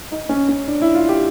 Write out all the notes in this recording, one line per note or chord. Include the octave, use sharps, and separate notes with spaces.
D#4
C#4
C#4
D4
E4
F4
G4